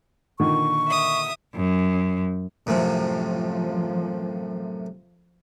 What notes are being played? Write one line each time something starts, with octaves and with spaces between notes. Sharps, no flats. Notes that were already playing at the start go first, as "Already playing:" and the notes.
A#2 D3 D#3 C#6
E5 D#6
F#2
F#2 A2 C3 F3
F3